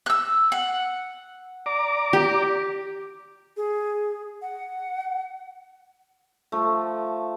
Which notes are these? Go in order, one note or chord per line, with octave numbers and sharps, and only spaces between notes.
E6 F#6
F#5
D5 A#5 D6
G4
G#4
F#5
F3 A3